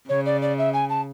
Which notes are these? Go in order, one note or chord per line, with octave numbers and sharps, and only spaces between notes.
C#3 C#5
D5
D5
E5
G#5
A5